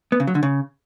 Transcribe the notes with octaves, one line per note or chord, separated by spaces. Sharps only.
B3
C#3
F#3
D3
C#3